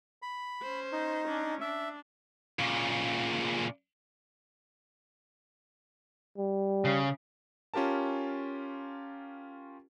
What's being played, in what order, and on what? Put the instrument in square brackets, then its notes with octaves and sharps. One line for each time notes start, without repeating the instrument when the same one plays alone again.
[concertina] B5
[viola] C#4 C5
[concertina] D#4
[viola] C#4 D4
[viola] D4 [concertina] E5
[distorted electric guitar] A#2 C#3
[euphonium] G3
[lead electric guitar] C#3
[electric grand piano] C#4 F4 G4 A#4 A5